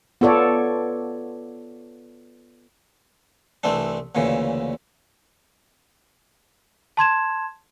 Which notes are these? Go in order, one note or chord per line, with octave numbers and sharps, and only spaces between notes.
B3 F4 A4 C#5 D5
C2 E3 A3 C4 D4
D2 A#2 C#3 E3
A5 C6 G#6 E7